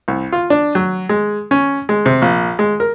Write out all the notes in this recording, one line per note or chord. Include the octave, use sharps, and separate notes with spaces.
C2
F4
D4
F#3
G#3
C#4
G#3
C3
A#1
G#3
A#4